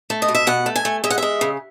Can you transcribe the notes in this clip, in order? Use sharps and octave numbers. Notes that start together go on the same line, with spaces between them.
A3
D#5
B2
E5
B2 F#5
A3
G#5
A3
G#3 E5
F#5
G#3 E5
C#3